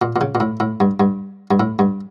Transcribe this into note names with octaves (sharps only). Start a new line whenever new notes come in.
A#2
A#2
C#3
A#2
A2
A2
G2
G2
G2
A2
G2